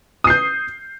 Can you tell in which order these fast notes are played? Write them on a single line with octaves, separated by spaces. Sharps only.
D#6 C7 G6